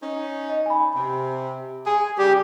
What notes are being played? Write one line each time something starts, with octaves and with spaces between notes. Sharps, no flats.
C#4 D#4
D#5
G#5 B5
C3
G#4 G#5
C#3 G3 G4